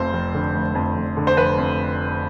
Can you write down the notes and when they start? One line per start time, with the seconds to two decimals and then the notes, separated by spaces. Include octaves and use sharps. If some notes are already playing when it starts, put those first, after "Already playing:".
Already playing: F1 F2 C5
0.13 F1
0.35 D3
0.55 F1
0.75 F2
0.96 F1
1.17 D3
1.27 C5
1.37 F1 B4
1.58 F2